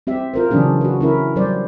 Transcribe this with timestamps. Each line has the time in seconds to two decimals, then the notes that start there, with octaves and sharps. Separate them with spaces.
0.07 C4 G4 E5
0.34 F4 A#4 C5
0.50 C#3 E3 F#3 C#4 D4 G#4
0.81 F#4 B4
1.01 C#4 E4 A#4
1.36 F#3 G3 C5 D5